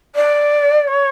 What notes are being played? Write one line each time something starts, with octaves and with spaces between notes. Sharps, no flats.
D5
C#5